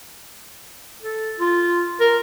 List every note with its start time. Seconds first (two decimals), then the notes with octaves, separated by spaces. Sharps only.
1.03 A4
1.40 F4
2.00 A#4